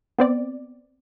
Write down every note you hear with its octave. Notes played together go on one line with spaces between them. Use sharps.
B3 C4 D5